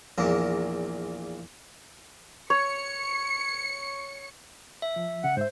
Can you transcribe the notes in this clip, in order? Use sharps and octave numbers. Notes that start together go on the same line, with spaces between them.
A#1 E2 A#3
C#5 C#7
E5
F3
C#3 F#5
G#2 C5 E5